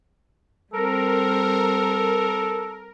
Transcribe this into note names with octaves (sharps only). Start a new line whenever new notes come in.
G3 C4 A4 A#4